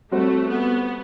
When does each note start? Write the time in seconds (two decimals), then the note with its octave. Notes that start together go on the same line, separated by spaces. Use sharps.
0.11 G3 A3 C4 F#4 C5
0.49 B3